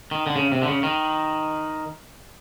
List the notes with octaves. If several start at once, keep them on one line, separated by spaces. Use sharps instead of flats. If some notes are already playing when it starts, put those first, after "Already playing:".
D#3
D3
C#3
C3
D3
C#3
D#3